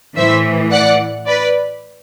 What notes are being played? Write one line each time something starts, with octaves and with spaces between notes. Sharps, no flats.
A2 E3 C5 E5
D5 F#5
B4 D5